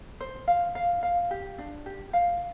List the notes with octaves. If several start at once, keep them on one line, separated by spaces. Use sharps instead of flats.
C5
F5
F5
F5
G4
D4
G4
F5